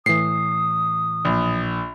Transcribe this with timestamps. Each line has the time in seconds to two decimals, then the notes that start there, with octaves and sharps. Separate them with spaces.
0.06 A2 E3 D#6 C7
1.25 A#1